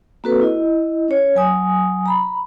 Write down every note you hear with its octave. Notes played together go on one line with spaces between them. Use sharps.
A#3 C4 F#4 A4 B4
E4 D#5
C#4 C#5
F#3 G#5 D#6
A#5 B5